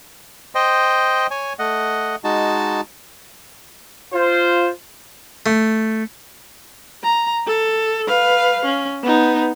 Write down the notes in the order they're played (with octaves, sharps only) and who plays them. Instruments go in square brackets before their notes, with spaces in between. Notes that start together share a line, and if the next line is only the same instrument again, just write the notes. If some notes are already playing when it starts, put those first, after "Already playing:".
[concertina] C5 D#5 G5
C#5 G#5
A3 D#5 F#5
G#3 D#4 F#4 A5
[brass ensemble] F4 C5
[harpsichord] A3
[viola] A#5
A4
B4 F5
C#4
B3 D#4